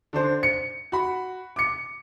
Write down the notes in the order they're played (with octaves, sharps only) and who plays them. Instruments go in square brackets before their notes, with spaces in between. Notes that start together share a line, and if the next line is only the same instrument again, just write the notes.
[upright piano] D3 D4 C5
C#7
F#4 B5
D6 C#7